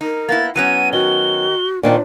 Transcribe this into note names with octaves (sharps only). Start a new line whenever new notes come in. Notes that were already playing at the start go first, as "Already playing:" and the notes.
D#4 A#4
A#3 B3 E4 A6
F#3 B3 C#4 F#5 D#7
D#3 F#4 G7
A#2 D#3 C4 D4